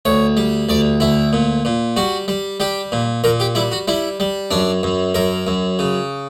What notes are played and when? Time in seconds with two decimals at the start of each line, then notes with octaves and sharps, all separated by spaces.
0.05 D2 C#5
0.37 G3
0.69 D2 D5
1.00 D2 E4
1.33 A#2
1.65 A#2
1.96 G3 F#4
2.28 G3
2.60 G3 G4
2.92 A#2
3.24 A#2 A#4
3.40 G4
3.55 G3 E4
3.72 F#4
3.88 G3 E4
4.20 G3
4.51 F#2 D4
4.83 F#2
5.14 F#2 A#4
5.47 F#2
5.79 C#3